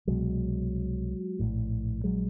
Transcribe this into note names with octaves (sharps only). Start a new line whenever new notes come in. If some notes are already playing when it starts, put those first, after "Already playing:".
C2 B2 F#3 G#3
A#1 A2
F#3 G#3